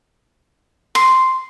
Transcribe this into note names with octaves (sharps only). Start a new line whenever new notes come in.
C6